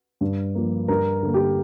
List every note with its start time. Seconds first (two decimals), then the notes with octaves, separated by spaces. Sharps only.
0.21 G2
0.55 F3 A#3
0.88 G2 A#4
1.23 D3 A#3
1.34 G4